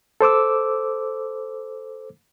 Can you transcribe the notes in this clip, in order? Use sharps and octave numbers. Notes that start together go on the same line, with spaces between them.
A4 C5 D6 E6